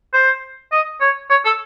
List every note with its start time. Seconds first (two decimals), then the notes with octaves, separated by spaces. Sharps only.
0.13 C5
0.72 D#5
1.01 C#5
1.30 C#5
1.45 A4